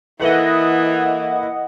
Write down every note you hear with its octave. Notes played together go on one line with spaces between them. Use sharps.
E3 A#3 E4 A4 B4 D#5 E5 F#5